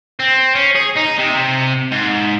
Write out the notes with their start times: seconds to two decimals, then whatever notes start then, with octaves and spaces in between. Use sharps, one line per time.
0.19 C4
0.55 C#4
0.75 G#4
0.96 D#4
1.18 C3
1.92 G#2